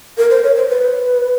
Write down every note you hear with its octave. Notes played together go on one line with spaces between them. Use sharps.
A#4
C5
C#5
C5
B4